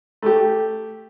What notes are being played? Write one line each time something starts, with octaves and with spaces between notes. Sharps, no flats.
A3 G4